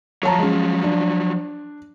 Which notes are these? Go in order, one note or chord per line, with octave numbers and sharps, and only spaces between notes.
F3 F#3 C#5 A5 A#5
G#3 C#4
D4